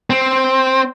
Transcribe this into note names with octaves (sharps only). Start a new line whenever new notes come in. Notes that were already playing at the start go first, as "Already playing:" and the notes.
C4